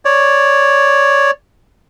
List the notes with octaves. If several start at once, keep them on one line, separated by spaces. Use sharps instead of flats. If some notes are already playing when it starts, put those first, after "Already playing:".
C#5 D5